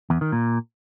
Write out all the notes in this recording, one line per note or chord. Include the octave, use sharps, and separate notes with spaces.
E2
D#3
A#2